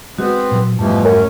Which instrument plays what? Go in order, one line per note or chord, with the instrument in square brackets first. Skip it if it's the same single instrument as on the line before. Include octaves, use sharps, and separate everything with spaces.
[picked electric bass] G#3 [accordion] B3 C4 [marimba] F#4
[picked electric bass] A#2 F#3
[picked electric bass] F1 G#2 G3 [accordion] B2 E3 F3 [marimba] A3
[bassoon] F#2 [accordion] C#4